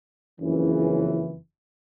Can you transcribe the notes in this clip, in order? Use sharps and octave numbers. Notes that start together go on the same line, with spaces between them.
F#1 F2 C#3 E3